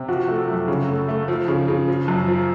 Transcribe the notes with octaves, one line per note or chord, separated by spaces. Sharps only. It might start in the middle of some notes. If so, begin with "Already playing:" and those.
Already playing: C3
F3 F#4
A3
F#2
C#3
A3
A3
F3
C#3
C#3
F3
F#2
F3